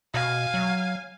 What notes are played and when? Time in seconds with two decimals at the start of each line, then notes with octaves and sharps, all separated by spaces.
0.14 B2 F5 G#5
0.54 F#3